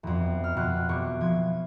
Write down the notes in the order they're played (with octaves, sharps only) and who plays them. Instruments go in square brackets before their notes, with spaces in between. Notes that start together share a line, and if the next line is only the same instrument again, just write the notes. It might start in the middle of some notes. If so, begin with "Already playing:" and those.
[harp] E1 F2
F6
F2 B2 F#6
E1 G4 C#6
F3 G#6